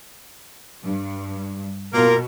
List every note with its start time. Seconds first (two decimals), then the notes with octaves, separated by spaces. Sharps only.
0.84 G2
1.93 B2 A#3 F4 A#4